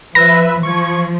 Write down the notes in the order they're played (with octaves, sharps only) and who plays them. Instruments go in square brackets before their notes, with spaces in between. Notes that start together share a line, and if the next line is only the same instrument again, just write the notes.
[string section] F3 [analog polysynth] B4 E5 [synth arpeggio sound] A#6
[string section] F3 [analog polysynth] C#6 G#6